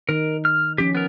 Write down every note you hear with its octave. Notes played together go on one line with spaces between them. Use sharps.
D#3 D#4 A#4
F6
F3 C#4 G4
B3 A#4